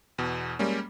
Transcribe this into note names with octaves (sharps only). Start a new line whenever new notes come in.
E2 B2
G3 G#3 A#3 C#4